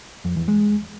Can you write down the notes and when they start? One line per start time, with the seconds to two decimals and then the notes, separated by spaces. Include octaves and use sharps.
0.25 F2
0.36 E2
0.48 G#3